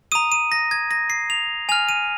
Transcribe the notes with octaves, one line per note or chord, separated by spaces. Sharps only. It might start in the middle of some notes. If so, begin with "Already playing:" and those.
A#5 D#6 D#7
D#7
A#6
G#6
A#6
C7
F7
G#5 F6 F7
D#7